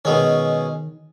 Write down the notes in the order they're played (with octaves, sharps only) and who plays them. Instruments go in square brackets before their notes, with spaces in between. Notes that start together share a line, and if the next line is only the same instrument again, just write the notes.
[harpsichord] B2 G#3 C#4 [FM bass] D#3